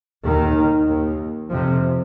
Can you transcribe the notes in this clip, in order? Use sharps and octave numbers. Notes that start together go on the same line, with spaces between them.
D#2 D#3
D#2
F2 C3 F3